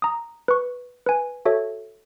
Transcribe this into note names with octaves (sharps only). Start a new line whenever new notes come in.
A#5 D#6
B4 C#6
B4 G#5
F#4 A4 C#5 E5